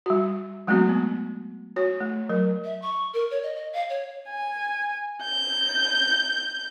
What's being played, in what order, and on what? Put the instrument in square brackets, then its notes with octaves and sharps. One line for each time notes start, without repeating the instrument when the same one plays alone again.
[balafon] G3 F#4
F#3 G#3 A3 B3 C4 F#4
B3
F#4 C#5
A3
F#3 A#4
[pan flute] E5
C#6
A#4
C#5
D#5
D#5
F5
C#5
[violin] G#5
G6